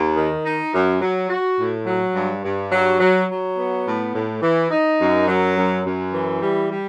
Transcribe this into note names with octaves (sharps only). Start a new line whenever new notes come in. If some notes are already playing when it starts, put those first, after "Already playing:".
Already playing: D#2
D#3
D#4
F#2
F#3
F#4
A2
F#3
G2
G2
F#3
F#3
F#3
B3
A2
A2
E3
D#4
F#2
F#3
F#2
F#2
E3
G3
G3